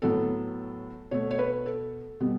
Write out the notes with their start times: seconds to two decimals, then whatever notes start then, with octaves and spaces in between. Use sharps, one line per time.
0.02 A2 F#3 B3 A4
1.11 B2 A3 C#5
1.31 C#5
1.39 B4
1.66 A4
2.20 B2 G3 B3